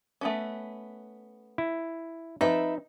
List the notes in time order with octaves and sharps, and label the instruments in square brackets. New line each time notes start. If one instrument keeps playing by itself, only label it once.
[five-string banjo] A3 B3 C#4
[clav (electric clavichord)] E4
[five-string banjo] F3 C4 [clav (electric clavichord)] D#4 [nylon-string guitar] B4 E5